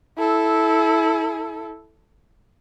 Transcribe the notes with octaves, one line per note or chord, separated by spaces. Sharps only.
E4 A4